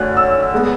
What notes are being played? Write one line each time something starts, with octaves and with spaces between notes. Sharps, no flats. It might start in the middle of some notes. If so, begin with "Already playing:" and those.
Already playing: F#2 D3 A3 C#4 F#6
E6
G#3 B3